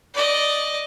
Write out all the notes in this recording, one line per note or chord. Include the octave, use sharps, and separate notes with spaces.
D5 D#5